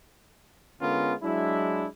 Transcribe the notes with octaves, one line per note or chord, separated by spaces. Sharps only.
D3 G#3 B3 C#4 F4 A#4
F#3 G#3 D4 E4